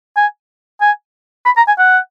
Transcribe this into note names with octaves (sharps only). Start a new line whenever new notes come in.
G#5
G#5
B5
A#5
G#5
F#5